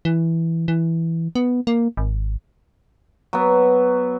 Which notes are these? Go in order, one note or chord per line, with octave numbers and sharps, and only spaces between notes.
E3
E3
B3
A#3
G#1
F#3 B3